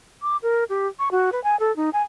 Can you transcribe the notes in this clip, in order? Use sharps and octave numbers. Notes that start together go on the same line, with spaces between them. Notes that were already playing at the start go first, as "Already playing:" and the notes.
D6
A#4
G4
C#6
F#4
B4
G#5
A4
D#4
G#5